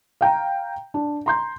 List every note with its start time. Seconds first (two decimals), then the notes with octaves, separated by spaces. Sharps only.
0.21 F5 G5 A#5
0.94 D4
1.26 A#5 C6 G6